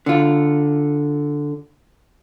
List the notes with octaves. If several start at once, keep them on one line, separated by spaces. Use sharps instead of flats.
D3 F4